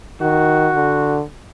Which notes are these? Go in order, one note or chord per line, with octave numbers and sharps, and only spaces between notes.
D#3 F#4
D3